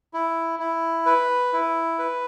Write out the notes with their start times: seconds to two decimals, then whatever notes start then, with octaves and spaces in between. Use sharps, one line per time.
0.14 E4
0.59 E4
1.06 B4
1.53 E4
1.99 B4